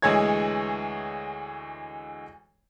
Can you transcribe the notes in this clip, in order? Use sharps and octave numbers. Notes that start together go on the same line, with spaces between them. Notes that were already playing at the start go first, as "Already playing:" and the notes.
D2 E3 G#3 G#4 C#5 G#6